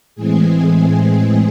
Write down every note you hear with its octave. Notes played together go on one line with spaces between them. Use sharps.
A2 E3 G#3 C4 G#4